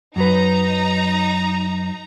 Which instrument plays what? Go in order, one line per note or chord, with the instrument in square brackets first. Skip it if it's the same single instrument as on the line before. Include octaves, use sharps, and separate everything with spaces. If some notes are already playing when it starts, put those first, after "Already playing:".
[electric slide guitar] F#2 F#3 B4 [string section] D#4 A#5